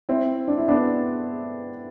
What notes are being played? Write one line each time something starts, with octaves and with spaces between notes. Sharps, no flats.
C4 E4
D4
E4
B3 D4